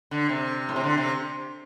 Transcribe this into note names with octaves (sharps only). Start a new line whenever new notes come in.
D3
C3
A2
C3
D3
C3